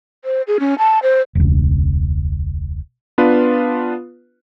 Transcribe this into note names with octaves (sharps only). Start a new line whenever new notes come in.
C5
G#4
C#4
A5
C5
E1 C#2
B3 D4 F4 B4